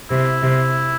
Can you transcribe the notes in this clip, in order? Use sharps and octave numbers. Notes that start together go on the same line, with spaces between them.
C3 E4
C3